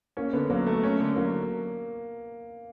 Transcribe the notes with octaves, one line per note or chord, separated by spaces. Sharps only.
A#3 C#4
D3 B3
F#3 A#3
A3
C#4
D3
F#3 A#3